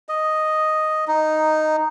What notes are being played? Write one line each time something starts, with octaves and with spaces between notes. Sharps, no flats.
D#5
D#4